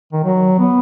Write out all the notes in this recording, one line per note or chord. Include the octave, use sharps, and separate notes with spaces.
D#3
F#3
B3